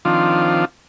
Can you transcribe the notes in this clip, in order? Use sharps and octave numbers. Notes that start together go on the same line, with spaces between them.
D#3 F3 C4 D4 F4